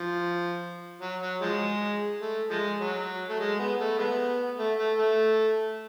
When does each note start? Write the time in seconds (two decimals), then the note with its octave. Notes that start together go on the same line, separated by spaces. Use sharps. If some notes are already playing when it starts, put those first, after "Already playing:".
Already playing: F3
1.01 F#3
1.21 F#3
1.42 F3 G#3
2.21 A3
2.50 F3 G#3
2.80 F#3
3.29 A3
3.40 G#3
3.59 B3
3.80 A3
3.99 G#3 B3
4.59 A3
4.78 A3
4.98 A3